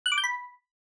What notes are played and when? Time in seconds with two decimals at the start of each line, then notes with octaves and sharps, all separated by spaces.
0.06 F#6
0.12 D6
0.18 G6
0.24 B5